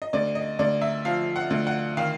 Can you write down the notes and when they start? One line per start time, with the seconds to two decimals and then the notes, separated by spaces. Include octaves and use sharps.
0.02 D#5
0.13 D2 D5
0.35 D#5
0.59 D2 D5
0.82 E5
1.05 F3 F5
1.36 F#5
1.50 D2
1.67 F#5
1.97 D#3 F5